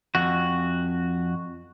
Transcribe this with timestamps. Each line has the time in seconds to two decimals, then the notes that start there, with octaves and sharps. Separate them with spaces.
0.15 F2 F#4